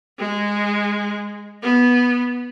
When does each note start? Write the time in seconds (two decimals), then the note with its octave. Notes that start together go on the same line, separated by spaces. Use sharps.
0.19 G#3
1.62 B3